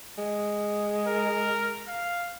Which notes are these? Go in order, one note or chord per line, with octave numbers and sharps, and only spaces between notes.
G#3
A#4
F5